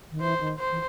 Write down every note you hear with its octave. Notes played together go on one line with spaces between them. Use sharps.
D#3
E3 C5
D#3
C5
E3